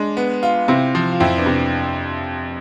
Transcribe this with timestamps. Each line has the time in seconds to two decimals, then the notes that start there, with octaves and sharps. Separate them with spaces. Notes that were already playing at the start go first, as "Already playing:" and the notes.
Already playing: G#3 D4
0.17 B3
0.43 F4
0.68 C3 C4 E4
0.95 F3
1.12 F4
1.20 F2 C4 E4
1.38 B3 D4
1.46 C3